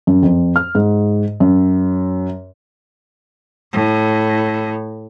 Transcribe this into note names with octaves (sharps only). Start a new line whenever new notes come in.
F#2
F2
F6
G#2
F#2
A2